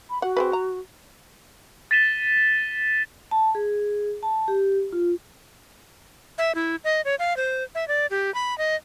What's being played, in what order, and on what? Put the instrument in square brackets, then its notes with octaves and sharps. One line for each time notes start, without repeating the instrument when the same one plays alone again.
[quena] B5
[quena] F#4 [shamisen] F#5
[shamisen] C4 G#4 B4
A#5
[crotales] A6 B6 D#7 E7 G7
[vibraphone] A5
G#4
A5
G4
F4
[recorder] E5
E4
D#5
C#5
F5
C5
E5
D5
G4
B5
D#5